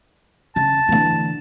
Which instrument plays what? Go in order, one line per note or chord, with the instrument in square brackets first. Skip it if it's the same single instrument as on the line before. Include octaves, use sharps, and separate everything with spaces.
[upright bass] C#3 [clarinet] A5
[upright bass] D3 E3